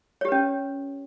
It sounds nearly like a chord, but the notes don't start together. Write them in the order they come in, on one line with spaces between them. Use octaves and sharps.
C#5 G4 B4 C#4